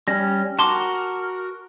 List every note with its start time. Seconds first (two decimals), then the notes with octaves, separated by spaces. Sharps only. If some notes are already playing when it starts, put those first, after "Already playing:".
0.08 G3 C#4 A#6
0.59 F#4 A#4 A5 C6 D6